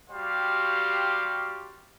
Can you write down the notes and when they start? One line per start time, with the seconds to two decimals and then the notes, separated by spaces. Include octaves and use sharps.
0.11 G3 F#4 G4 C5 F5